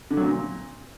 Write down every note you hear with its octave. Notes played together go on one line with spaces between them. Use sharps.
D3
F#3
A#2